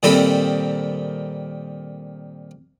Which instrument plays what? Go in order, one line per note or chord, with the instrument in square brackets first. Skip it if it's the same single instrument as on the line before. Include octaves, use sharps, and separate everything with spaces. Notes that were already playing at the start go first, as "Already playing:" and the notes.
[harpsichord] A#2 D#3 G3 C4 A4 B5